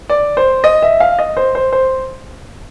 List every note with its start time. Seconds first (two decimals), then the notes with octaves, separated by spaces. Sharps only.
0.10 D5
0.37 C5
0.64 D#5
0.82 E5
1.00 F5
1.19 D#5
1.37 C5
1.55 C5
1.73 C5